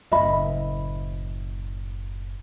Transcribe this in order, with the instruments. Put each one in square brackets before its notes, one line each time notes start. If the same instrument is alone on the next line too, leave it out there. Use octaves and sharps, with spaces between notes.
[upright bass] F#1 A2 [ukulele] D#5 E5 B5